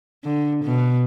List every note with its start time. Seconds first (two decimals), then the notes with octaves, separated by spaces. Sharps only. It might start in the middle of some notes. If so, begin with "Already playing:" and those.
0.24 D3
0.64 B2